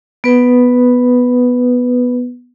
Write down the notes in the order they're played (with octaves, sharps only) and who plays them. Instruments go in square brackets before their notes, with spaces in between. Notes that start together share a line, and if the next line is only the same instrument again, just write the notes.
[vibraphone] B3 B4